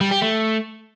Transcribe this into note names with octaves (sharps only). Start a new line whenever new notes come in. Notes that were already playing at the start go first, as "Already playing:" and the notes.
G3
G4
A3